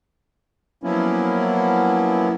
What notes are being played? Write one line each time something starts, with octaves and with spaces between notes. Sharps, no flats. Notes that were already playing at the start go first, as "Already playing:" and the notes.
F3 F#3 A#3 B3 C#4 E4